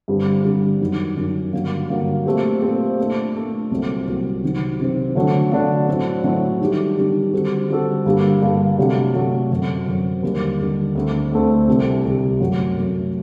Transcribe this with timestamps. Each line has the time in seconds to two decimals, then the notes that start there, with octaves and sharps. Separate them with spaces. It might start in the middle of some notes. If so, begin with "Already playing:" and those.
0.08 G2 D3 G3 C4
0.45 G2 D3 G3 C4
0.81 F#2 D#3 F#3
1.17 F#2 D#3 F#3
1.53 G2 D3 F#3 A#3
1.89 G2 D3 F#3 A#3
2.26 A#2 A3 C4 G4
2.62 A#2 A3 C4 G4
2.98 A#2 A3 D4
3.34 A#2 A3 D4
3.70 C2 A#2 F#3 C4
4.07 C2 A#2 F#3 C4
4.43 C3 D#3 F#3 C4
4.79 C3 D#3 F#3 C4
5.15 D3 F#3 A3 D4
5.51 D3 F#3 A3 D4
5.88 A2 F#3 A3 C4
6.24 A2 F#3 A3 C4
6.61 D#3 G3 D4 G4
6.97 D#3 G3 D4 G4
7.33 D3 G3 C4 F#4 A4
7.69 D3 G3 C4 F#4 A4
8.05 G2 D3 G3 A#3
8.42 G2 D3 G3 A#3
8.78 C3 F#3 A3 D4
9.14 C3 F#3 A3 D4
9.51 F#2 F#3 C4
9.87 F#2 F#3 C4
10.23 D#2 D3 G3
10.59 D#2 D3 G3
10.95 D2 D3 A3 C4
11.32 D2 D3 A3 C4
11.67 C2 C3 G3
12.04 C2 C3 G3
12.40 F#2 F#3 A3
12.77 F#2 F#3 A3